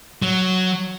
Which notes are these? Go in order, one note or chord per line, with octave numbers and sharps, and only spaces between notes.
F#3